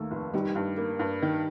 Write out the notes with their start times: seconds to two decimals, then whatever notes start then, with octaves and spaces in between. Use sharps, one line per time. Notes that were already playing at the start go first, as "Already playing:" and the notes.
Already playing: D#2 A3 A#3
0.11 F1
0.34 D#3 G3
0.55 G2
0.78 A#3
0.99 G2
1.22 D#3